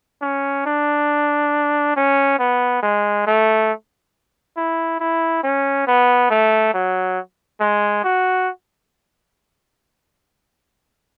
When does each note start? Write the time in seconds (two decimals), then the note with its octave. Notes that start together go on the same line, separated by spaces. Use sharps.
0.22 C#4
0.66 D4
1.96 C#4
2.39 B3
2.83 G#3
3.27 A3
4.57 E4
5.00 E4
5.43 C#4
5.87 B3
6.30 A3
6.74 F#3
7.61 G#3
8.04 F#4